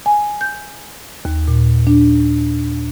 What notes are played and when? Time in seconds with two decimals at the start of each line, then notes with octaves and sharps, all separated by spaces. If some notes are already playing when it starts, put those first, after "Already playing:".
0.06 G#5
0.41 G6
1.25 D#2
1.48 A#2
1.87 D4